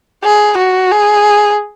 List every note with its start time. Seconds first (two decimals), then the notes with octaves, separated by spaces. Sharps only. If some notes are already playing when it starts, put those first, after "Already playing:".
0.24 G#4
0.58 F#4
0.91 G#4